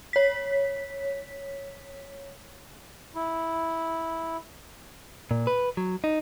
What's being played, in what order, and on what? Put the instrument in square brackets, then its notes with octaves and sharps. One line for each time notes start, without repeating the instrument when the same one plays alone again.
[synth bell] C#5 B6
[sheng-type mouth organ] E4
[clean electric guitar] A#2
B4
F#3
D#4